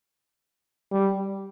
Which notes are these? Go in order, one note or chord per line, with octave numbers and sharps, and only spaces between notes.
G3